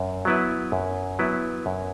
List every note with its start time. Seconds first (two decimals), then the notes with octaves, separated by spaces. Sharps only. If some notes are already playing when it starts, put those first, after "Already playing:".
Already playing: F#2
0.25 F#3 B3 E4 B4
0.72 F#2
1.19 F#3 B3 E4 B4
1.66 F#2